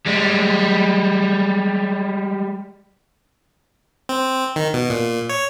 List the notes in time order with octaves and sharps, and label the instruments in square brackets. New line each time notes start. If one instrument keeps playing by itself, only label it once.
[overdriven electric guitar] G3 G#3
[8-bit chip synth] C4
D#3
B2
A#2
C#5